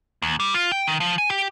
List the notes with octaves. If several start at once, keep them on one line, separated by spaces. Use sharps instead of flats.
D#2
G3
F4
G5
D#3
F3
G#5
G4